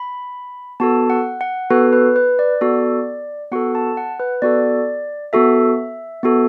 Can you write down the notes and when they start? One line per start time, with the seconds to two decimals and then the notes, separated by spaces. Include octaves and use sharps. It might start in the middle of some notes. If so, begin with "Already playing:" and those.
Already playing: B5
0.80 B3 F#4 A4 A5
1.10 F#5
1.41 F#5
1.70 B3 F#4 A4 B4
1.93 B4
2.16 B4
2.39 D5
2.61 B3 F#4 A4
3.51 B3 F#4 A4 F#5
3.75 A5
3.97 F#5
4.20 B4
4.42 B3 F#4 A4 D5
5.33 B3 F#4 A4 E5
6.23 B3 F#4 A4